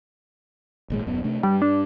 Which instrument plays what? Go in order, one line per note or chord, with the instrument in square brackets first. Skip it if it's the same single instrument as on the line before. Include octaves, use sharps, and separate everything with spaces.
[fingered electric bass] G#1 A#2 G#3
D#1 F#2 B3
C3 A3 D4
[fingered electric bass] G2 [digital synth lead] G3
[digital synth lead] D4